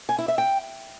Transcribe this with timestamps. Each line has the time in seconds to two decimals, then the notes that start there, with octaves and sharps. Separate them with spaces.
0.09 G#5
0.18 E4
0.28 E5
0.38 G5